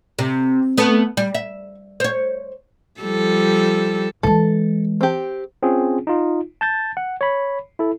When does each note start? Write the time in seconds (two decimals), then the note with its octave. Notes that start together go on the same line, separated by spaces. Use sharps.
0.19 C3
0.78 A3 B3
1.17 G3
1.35 E5
2.00 C5 C#5
3.01 F3 G3 A4
4.23 E3 G#3 A4
5.01 C4 G4
5.63 C4 C#4 F4 G#4
6.07 D#4 F4
6.61 A5 G6 A6
6.97 F#5
7.21 C#5 B5
7.79 E4 A4